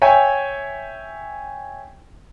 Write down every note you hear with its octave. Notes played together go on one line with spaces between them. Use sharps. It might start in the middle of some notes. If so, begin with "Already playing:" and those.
C#5 E5 G5 G#5